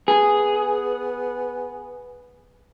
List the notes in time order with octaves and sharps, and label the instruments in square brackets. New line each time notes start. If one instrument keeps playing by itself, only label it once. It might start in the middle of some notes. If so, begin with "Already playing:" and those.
[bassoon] B3 [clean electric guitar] G#4